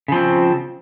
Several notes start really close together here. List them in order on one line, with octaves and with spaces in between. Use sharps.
C#3 F3 C4